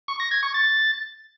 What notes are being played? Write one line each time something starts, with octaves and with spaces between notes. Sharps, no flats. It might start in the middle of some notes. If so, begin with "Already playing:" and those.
C#6
A#6
G#6
C#6
A6